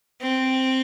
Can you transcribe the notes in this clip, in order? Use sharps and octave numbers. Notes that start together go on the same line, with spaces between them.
C4